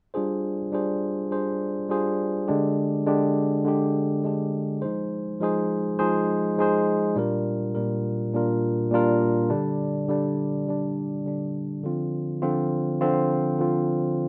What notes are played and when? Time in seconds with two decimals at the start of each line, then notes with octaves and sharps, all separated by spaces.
0.14 G3 D4 F4 G#4 C5
0.72 G3 D4 F4 G#4 C5
1.31 G3 D4 F4 G#4 C5
1.89 G3 D4 F4 G#4 C5
2.48 D3 G#3 D4 G4
3.06 D3 G#3 D4 G4
3.65 D3 G#3 D4 G4
4.24 D3 G#3 D4 G4
4.82 F3 G#3 D#4 G#4 C5
5.40 F3 G#3 D#4 G#4 C5
5.99 F3 G#3 D#4 G#4 C5
6.58 F3 G#3 D#4 G#4 C5
7.16 A#2 G3 D4 F4 A#4
7.75 A#2 G3 D4 F4 A#4
8.33 A#2 G3 D4 F4 A#4
8.91 A#2 G3 D4 F4 A#4
9.50 D3 G3 D4
10.08 D3 G3 D4
10.67 D3 G3 D4
11.25 D3 G3 D4
11.84 D3 F3 C4 F4
12.42 D3 F3 C4 F4
13.01 D3 F3 C4 F4
13.59 D3 F3 C4 F4